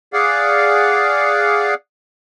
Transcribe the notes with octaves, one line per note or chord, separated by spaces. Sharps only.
G#4 D5 F5 F#5